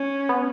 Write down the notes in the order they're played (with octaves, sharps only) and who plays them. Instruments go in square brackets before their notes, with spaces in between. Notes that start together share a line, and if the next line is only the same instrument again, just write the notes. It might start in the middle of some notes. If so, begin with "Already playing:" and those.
Already playing: [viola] C#4
[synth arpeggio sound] B3